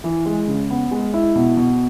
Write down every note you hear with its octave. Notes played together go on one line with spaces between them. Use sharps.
E3
G#3
C#3
B3
G#3
E4
B2
B2